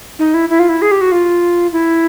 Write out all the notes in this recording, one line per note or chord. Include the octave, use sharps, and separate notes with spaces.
D#4
E4
E4
F4
E4
G#4
G4
F#4
F4
E4